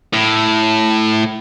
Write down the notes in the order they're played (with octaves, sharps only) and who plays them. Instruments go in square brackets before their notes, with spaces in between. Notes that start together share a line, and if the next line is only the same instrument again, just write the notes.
[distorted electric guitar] A2